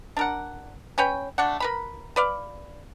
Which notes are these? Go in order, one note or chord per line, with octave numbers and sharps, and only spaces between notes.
D4 A#4 F#5
C#4 B4 C#5 G5
A3 D4 F#5
A#4 B4 B5
B4 D5 F5